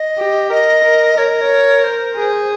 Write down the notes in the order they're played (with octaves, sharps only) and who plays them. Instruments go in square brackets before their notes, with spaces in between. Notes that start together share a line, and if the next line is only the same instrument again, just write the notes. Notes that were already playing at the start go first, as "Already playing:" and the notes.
Already playing: [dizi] D#5
[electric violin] G4
[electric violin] A#4 [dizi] D#5
[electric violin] A#4
[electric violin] A#4 [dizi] C#5
[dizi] D#5
C#5
C5
[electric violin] G#4